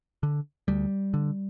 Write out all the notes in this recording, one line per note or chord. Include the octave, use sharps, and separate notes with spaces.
D3
D2 G3
D3